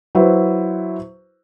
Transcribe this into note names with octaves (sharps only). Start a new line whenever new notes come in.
F#3 E4 B4 C5